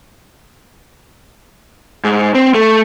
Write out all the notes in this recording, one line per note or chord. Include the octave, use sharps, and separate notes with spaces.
G#2
C4
A3